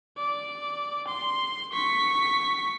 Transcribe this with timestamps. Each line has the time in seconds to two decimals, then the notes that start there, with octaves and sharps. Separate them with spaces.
0.17 D5
1.07 C6
1.72 C#6 B6